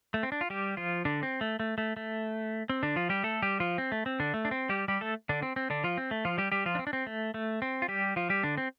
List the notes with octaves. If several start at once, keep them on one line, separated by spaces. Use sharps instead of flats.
A3
C4
D4
F4
G3 G4
F3 F4
D3 D4
C4
A3
A3
A3
A3
C4
D3 D4
F3 F4
G3 G4
A3 A4
G3 G4
F3 F4
C4
A3
C4
D3 D4
A3
D4
C4
G3 G4
G3 G4
A3 A4
D3 D4
C4
C4
D3 D4
F3 F4
C4
A3
F3 F4
G3 G4
G3 G4
F3 F4
D4
C4
D4
C4
A3
A3
C4
F4
G3 G4
F3 F4
G3 G4
D3 D4
C4